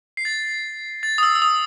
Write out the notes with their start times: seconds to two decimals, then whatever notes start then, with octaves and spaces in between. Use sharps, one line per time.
0.17 C7
0.25 A6
1.03 A6
1.18 D#6
1.23 E6
1.35 E6
1.42 D#6